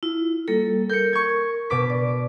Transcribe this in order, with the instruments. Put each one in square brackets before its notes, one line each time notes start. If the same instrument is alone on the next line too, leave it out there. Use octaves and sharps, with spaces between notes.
[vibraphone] E4 F4
G3 A#3 A4
[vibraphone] A#4 [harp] G6 C#7
[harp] C#6 G#6
B2 D6 B6
[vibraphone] D5